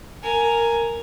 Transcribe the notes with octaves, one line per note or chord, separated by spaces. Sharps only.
A#4 G#5